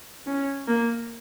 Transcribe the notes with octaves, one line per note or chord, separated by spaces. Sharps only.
C#4
A#3